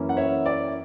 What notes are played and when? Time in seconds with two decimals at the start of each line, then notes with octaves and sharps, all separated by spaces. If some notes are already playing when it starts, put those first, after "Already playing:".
Already playing: F#2 E3 A#3 C#4 E4
0.09 F#5
0.17 C#5 E5
0.46 D5